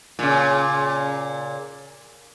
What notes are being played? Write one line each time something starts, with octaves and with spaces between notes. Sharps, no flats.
A#2 C#3